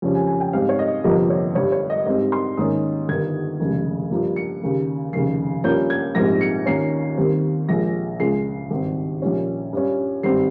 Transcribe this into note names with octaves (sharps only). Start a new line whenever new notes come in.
F2 C#3 G3 C#4
G#5
G#5
G5
G#2 G3 C4 F5
C#5
D#5
G1 F2 C3 F3 A#3 D#5
C#5
G1 G2 G3 C#5
C#5
D#5
G#2 G3 C4 D#5
C6
G#2 D#3 A#3 C#4 D#6
G1 G2 D#3 G3 G#6
F1 D#2 C#3 G#3
G2 F3 A#3
C#7
D#2 C#3 G3
F1 D#2 C#3 C7
G2 F3 A#3 C#4 G6
G#6
A#1 G#2 G3 C4 A#6
C#7
D#2 D#3 A#3 C#4 C7
D#2 D#3 G3 C4
A#1 A#2 G#3 A#6
C#2 C#3 F3 G#3 C7
G#1 G2 G3 C4
A#1 A#2 G3 C#4
G2 G3 C#4
G#1 G2 G3 C4 C7